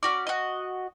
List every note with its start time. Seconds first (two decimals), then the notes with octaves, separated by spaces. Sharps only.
0.03 C#4 F#4 D5
0.27 F#4 D#5